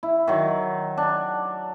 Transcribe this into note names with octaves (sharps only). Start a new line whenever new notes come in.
E4
D#3 F#3
D4